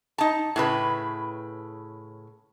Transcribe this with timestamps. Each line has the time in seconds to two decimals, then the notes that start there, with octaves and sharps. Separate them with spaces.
0.18 D#4 A5
0.56 A2 C#3 B4